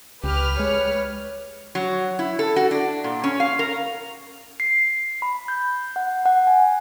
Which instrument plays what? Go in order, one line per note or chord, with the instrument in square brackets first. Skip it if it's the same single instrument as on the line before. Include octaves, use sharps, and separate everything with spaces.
[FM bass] C#2 [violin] G4 [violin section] B4 F6
[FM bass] G#3 [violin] C#5
[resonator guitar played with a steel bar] F#3
E4
A4
F#4
D4
A#2
C#4
F5
A#4
[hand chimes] C7
B5
G6
F#5
F#5
G#5